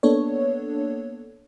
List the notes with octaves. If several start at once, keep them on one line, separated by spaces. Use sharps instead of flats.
A#3 B3 D4 A4 C#5